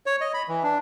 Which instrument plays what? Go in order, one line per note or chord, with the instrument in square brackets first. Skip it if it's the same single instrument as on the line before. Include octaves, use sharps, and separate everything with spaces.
[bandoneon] C#5
D#5
B5
E3
D4